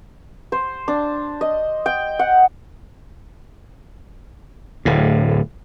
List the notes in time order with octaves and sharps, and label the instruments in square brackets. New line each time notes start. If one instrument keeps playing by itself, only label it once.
[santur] C5
D4
D#5
G5
F#5
[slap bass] D1 A2